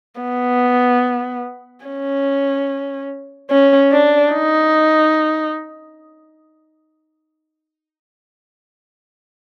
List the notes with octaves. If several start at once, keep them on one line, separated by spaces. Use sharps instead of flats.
B3
C#4
C#4
D4
D#4